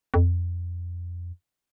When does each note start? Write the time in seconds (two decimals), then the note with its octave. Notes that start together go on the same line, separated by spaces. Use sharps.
0.14 F2